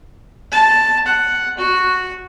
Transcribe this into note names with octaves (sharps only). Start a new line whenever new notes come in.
A5
F#5
F#4